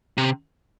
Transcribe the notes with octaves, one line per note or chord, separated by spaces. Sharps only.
C3